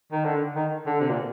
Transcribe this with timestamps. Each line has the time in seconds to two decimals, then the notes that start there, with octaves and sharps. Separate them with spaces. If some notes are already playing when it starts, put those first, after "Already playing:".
0.12 D#3
0.24 D3
0.55 D#3
0.86 D3
1.00 C3
1.09 A#2